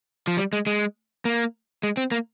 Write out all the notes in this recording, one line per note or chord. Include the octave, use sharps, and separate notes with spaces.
F3
G3
G#3
G#3
A#3
G#3
C4
A#3